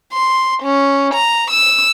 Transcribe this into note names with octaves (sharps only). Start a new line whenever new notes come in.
C6
C#4
A#5
E6